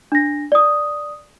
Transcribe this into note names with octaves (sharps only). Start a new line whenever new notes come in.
D4 A#6
D5 D#6